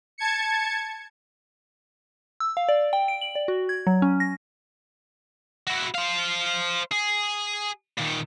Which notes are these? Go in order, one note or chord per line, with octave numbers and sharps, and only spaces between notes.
A5 G#6 C#7
E6
F5
D5
G5
D7
F#7
D5
F#4
G#6
F#3
C#4
A#6
E4 F#4
C5 F5
G#4
A#2 D#3